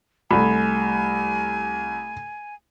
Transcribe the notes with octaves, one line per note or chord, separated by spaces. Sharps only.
C2 A3 G#5 B5